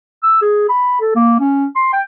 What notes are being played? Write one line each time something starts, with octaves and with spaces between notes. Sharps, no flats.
E6
G#4
B5
A4
A#3
C#4
C6
G5